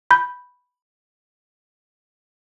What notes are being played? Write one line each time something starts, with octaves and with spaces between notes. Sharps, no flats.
B5 G6